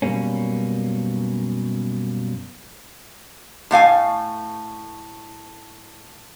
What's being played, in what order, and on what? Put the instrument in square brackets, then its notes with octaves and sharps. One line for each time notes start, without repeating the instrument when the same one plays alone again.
[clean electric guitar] F#2 B2 G3 A#3 C#4
[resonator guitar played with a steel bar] A2 A3 F5 G#5